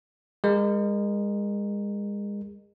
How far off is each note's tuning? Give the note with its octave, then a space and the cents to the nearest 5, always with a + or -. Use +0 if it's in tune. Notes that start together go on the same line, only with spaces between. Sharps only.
G#3 -30 A#4 -5